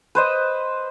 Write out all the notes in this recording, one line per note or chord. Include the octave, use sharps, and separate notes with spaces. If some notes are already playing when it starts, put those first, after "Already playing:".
B4 C5 D#5